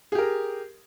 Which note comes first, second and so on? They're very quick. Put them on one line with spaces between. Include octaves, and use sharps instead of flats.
G#4 G4 A#4